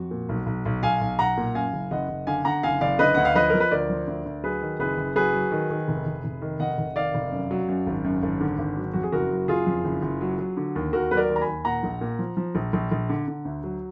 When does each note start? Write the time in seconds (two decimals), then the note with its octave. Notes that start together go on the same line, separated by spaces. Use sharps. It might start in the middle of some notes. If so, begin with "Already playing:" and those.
Already playing: F2 F#4
0.11 A#2
0.29 B1
0.46 B1
0.65 B1
0.83 B1 F5 G#5
1.01 B1
1.19 B1 F#5 A#5
1.37 A#2
1.55 F#2 F5 G#5
1.73 F#1
1.91 F#1 D#5 F#5
2.09 F#1
2.27 D3 F5 G#5
2.45 D3 F#5 A#5
2.63 F#1 F5 G#5
2.81 F#1 D5 F5
2.99 D3 B4 D#5
3.15 D2 F#5
3.25 F5
3.35 F3 B4 D#5
3.50 F3 A#4
3.60 B4
3.71 D2 A#4 D5
3.90 F3
4.07 D2
4.25 D2
4.44 F#3 G#4 B4
4.62 D#3
4.80 F#1 G#4 B4
4.97 F#1
5.16 F#3 G#4 B4
5.33 F#3
5.51 D#3
5.70 D#3
5.88 F1
6.06 F1
6.24 F1
6.42 D#3
6.60 F1 D#5 F#5
6.78 F1
6.96 D#3 D5 F5
7.14 F1
7.32 F#2
7.51 F#3
7.69 F#2
7.87 G#1
8.05 F#2
8.23 G#1
8.40 D3
8.58 G#1
8.76 F#3
8.93 F2 F#4
9.03 G#4
9.12 F#1 F#4 A#4
9.30 F#3
9.48 F#1 F4 G#4
9.67 F2
9.85 F#1
10.02 F#1
10.21 F#3
10.39 F#3
10.57 D3
10.75 D#2
10.93 D#2 F#4 A#4
11.11 F#3 B4
11.17 A#4 D5
11.29 D#2
11.36 A#5
11.41 G#5 B5
11.46 D#2
11.65 A#2 F#5 A#5
11.83 A#1
12.01 A#2
12.19 F3
12.37 F3
12.55 A#1
12.73 A#1
12.91 A#1
13.09 D3
13.28 D3
13.45 D2
13.64 F#3